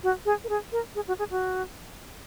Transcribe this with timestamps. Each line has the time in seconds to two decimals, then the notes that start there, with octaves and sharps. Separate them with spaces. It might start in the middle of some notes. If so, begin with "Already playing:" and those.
0.03 F#4
0.26 G#4
0.44 A#4
0.49 G#4
0.72 A#4
0.95 G#4
1.08 F#4
1.19 G#4
1.31 F#4